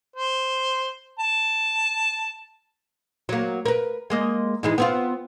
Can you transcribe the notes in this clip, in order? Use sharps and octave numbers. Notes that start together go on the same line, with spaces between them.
C5
A5
F#3 A#3
A#4 B4
G#3 A#3 D#5
G#2 E3 G#3
B3 C4 F4